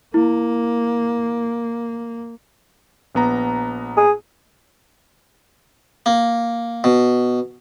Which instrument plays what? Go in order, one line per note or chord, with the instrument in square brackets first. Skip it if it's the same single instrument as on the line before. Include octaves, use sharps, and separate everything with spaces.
[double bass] A#3 [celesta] E4
[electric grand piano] A#1 B3 A#5
[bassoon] G#4
[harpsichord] A#3
B2